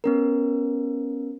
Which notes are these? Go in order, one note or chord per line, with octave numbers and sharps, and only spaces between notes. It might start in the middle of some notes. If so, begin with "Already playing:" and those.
B3 C#4 A#4